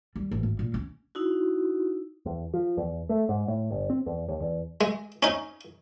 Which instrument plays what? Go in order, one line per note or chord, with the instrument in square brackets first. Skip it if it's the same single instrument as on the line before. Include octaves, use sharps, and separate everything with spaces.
[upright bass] G3
A1
G#1
A#2
C#4
[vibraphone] D#4 E4 F#4
[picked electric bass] E2
F3
E2
A3
G#2
A2
G1
C4
E2
D#2
E2
[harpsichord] G#3
C#4 D#4